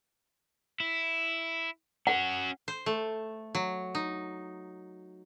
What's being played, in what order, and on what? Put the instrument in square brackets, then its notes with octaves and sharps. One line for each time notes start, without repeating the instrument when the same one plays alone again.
[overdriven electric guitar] E4
[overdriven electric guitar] C#4 F#4 [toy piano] F#5
[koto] C5
A3
F#3
D#4